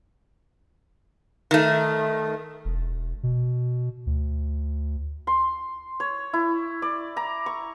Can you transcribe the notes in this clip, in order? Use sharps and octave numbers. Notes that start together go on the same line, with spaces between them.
D#3 A3
E1
B2
D2
C6
C#5
E4
D5
A#5
C#6